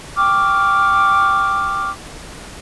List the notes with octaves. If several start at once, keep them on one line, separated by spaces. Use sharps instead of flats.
G5 C#6 D6 F6